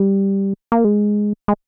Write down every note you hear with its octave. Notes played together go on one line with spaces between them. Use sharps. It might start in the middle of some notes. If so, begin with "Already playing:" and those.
Already playing: G3
A#3
G#3
G#3